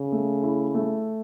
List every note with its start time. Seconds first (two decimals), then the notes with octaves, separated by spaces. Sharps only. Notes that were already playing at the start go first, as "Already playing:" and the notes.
Already playing: C#3
0.12 A3
0.43 E4
0.75 A3